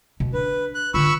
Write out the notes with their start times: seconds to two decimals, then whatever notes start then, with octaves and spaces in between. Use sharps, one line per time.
0.20 B2
0.34 D4 B4
0.75 F#6
0.94 D3 F4 B5 C#6 E6